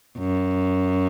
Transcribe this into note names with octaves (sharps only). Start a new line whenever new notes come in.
F#2